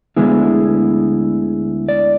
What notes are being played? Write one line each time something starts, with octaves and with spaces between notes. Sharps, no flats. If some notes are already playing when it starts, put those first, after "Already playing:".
D2 D3 G#3 B3 E4 G#4
D5